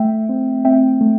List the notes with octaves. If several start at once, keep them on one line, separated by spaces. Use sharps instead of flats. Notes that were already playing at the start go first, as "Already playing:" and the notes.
Already playing: A3 E5 G5
C4
C4 E5 G5
A3